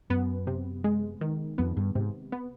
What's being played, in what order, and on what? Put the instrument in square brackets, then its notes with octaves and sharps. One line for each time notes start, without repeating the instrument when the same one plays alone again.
[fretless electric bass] F#2 [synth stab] B3
[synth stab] C3
G#3
D#3
[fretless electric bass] F2 [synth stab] B3
[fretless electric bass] G2
[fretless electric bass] G#2 [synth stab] C3
[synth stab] B3